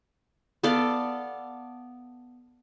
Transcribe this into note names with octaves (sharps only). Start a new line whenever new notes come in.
B3 A4 D5 F5